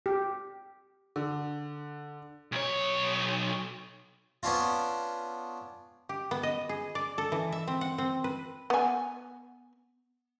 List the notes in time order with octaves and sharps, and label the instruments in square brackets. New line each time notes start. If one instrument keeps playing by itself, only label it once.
[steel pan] G4
[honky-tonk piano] D3
[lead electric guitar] B1 C#5
[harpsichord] B3 C#4 D4 F4
[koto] G4
B3
D#5
G#4
D5
A4
E3
E5
C4
F#5
C4
B4
[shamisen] B3 G#5